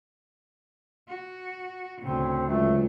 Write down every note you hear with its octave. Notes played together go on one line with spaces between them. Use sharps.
F#4
D2 A2 C#3 C4
C#2 F#3 A3